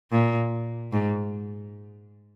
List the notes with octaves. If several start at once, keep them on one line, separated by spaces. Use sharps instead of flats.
A#2
G#2